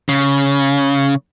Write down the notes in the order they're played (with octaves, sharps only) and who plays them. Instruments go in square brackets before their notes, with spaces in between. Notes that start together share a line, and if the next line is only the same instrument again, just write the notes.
[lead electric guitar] C#3